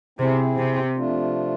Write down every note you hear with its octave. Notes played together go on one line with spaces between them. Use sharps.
C3 C4 E4 G#4
C3
C3 F3 A3 D4 F4